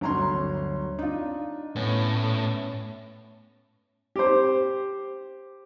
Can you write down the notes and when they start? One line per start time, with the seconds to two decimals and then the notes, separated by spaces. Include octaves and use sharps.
0.01 G1 D2 F#3 C#5 A#5 C6
0.99 D4 D#4 F4
1.76 A2 B3 C#4
4.16 G4 C5